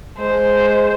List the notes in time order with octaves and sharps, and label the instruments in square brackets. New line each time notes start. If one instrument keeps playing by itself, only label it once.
[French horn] G#3 [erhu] C5